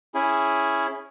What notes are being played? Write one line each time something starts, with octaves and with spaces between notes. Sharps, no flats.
C#4 E4 G#4